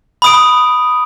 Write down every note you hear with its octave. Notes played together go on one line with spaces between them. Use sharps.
B5 D#6 D7